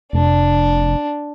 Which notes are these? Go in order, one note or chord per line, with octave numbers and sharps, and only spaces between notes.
F1 D4